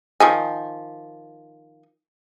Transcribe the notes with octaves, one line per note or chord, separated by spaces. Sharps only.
D#3 F3 G#5